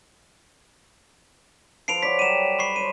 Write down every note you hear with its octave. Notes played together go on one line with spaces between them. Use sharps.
F3 A4 B4 C7 D7 F7
C#5 D5 F#5 B6
F#3 G3 D6 D#7 E7
B5 C#6 C7
C5 C#5 D#7